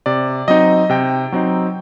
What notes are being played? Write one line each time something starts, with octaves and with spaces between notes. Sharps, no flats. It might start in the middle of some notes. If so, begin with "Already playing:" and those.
C3 D5
F#3 C4 D#4 D#5
C3 G5
F#3 C4 D#4